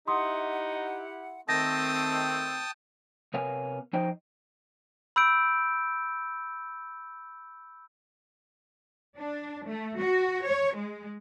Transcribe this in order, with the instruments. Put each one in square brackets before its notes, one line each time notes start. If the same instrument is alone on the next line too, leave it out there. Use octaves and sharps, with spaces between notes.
[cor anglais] D#4 [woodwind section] E4 G4 F#5 [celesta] C6 D#6
[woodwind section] D#3 C4 [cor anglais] A3 [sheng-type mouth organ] G5 A5 D#6 [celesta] A#6
[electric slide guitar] C3 B3 A#4 C#5 F5 G#5
F3 D#4 C5 D#5 G5
[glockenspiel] B5 E6 G6 D7
[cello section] D4
A3
F#4
C#5
G#3